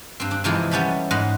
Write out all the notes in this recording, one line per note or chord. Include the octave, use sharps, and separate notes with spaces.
G2 C4
D4
C3 E3 F3 G#3 D#4 E4
G3 B3 C#4 G4 A4 B5
G#2 D#5 F#5 B5 C6